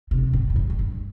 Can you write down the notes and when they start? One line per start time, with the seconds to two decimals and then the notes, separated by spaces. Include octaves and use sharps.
0.11 C3
0.33 A2
0.50 A2
0.56 G2
0.70 A2
0.79 G2